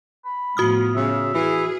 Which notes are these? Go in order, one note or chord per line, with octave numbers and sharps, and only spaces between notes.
B5
A2 F3 B3 F#4 D#6 F6
C#3 E5
E3 G#4